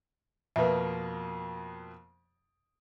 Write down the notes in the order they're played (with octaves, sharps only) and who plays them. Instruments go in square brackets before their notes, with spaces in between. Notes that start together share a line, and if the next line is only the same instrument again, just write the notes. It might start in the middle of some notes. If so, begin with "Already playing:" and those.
[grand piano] F2 B2 A#3 [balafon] B4 E5